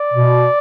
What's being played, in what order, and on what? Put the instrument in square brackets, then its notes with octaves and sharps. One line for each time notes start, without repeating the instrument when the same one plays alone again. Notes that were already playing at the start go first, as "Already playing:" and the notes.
Already playing: [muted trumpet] D5
[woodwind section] B2